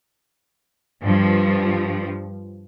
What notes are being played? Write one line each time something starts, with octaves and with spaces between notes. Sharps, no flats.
G2 F3